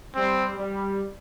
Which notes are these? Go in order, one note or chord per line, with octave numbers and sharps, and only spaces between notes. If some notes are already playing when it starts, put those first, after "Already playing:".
G3 C4
G3